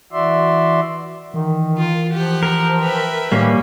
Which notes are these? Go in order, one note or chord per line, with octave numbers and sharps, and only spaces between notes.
E3 F#4 D5 E5 C6
D#3 E3
F4
F3 G4 F#5
A#4
B4 E5 G5
A2 D#3 G3 A#3 C#4